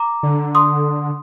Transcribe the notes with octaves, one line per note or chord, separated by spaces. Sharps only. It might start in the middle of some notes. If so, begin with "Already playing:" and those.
Already playing: A#5 D6
D3
C6 D#6